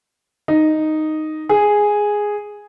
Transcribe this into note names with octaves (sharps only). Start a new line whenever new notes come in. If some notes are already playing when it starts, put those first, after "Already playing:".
D#4
G#4